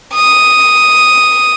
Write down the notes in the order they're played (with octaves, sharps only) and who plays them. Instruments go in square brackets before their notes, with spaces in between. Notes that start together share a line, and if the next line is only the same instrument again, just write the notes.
[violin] D#6